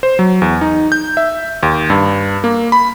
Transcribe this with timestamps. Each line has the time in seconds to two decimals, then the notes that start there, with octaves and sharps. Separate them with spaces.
0.03 C5
0.19 F#3
0.42 E2
0.61 D#4
0.92 G6
1.17 E5
1.63 D#2
1.90 G2
2.44 A#3
2.72 B5